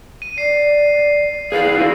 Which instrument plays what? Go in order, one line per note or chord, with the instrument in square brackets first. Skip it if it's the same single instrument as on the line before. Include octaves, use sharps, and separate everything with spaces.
[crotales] D#7
[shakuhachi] D5 [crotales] C7
[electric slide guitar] G#4 B4 D5 [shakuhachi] F5
[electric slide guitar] E4 F#4